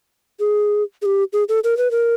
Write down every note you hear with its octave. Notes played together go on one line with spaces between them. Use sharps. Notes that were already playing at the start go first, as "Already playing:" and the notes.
G#4
G#4
G4
G#4
A4
A#4
B4
A#4